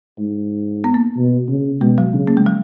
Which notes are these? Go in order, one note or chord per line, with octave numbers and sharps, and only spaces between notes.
G#2
B3
A#3
B2
C#3
B2 G#3
F#3
C#3
A#3
G#3
F#3